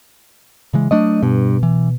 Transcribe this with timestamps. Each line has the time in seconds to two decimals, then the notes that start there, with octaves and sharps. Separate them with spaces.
0.74 C#3 E3 G#3
0.91 F#3 A3 D4 D#5
1.23 G2 B2
1.63 E3